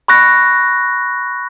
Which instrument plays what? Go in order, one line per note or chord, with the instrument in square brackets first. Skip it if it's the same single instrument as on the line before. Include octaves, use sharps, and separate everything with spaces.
[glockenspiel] B5 C#6 F#6 A#6